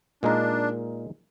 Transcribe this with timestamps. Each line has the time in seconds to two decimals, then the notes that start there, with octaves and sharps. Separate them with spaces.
0.23 A#2 G#3 D4 D#4 A#4